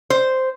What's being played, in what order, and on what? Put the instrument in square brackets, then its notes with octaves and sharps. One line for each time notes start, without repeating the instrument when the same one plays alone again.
[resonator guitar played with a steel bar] C5